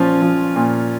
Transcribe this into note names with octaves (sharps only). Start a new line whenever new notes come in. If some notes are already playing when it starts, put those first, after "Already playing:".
Already playing: A#2 F3 C#4 F4
F3
A#2